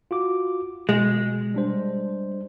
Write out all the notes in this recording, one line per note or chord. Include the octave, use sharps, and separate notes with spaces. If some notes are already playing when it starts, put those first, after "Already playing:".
F4 F#4 D6
B2 G#3
G3 D4 C5